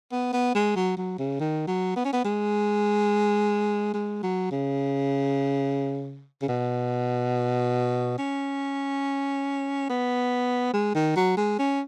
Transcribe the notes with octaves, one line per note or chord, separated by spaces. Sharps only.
B3
B3
G#3
F#3
F#3
C#3
D#3
F#3
B3
C#4
B3
G#3
G#3
F#3
C#3
C#3
B2
C#4
B3
G#3
D#3
F#3
G#3
C#4